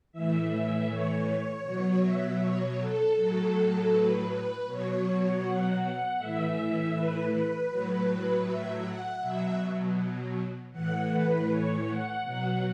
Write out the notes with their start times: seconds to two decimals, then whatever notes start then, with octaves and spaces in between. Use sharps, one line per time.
0.12 A2 E3 E5
0.50 E5
0.89 C#5
1.64 B2 F#3
2.02 E5
2.40 C#5
2.78 A4
3.16 A2 F#3
3.91 B4
4.29 B4
4.67 B2 F#3 C#5
5.43 F#5
5.80 F#5
6.18 A2 E3 E5
6.94 B4
7.32 B4
7.69 A2 F#3
8.45 E5
8.83 F#5
9.21 B2 F#3 E5
10.72 A2 E3 F#5
11.10 B4
11.49 C#5
11.86 F#5
12.23 B2 F#3 F#5